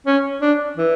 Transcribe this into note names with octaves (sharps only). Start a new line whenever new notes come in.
C#4
D4
E3